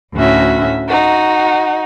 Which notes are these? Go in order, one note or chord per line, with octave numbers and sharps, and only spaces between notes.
D2 A2 C#4 F#4 E5
D#4 F#4